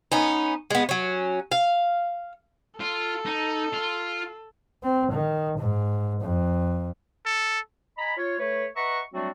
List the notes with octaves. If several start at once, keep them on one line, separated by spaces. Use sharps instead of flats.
B3 C#4 D#4
G#3 B3
F#3 C#4
F5
F4 A4
D#4
F4
C4
D#3
G#2
F2
A4
D#5 G#5 A#5 B5
F4 C#5
A3 A4 B4 C#5
B4 D#5 E5 F#5 A#5 C#6
F#3 G3 A3 C4 D4 F#4